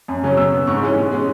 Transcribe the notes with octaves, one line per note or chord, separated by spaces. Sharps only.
F#2
C#3 F#3 C#4
B2 E6
B3
G#2 C#6
E3 G#3 C#4
B2
G#3 C#4